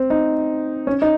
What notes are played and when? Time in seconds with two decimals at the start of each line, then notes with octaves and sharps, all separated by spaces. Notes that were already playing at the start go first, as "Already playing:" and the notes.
Already playing: C4
0.10 D#4
0.87 C#4
1.02 D#4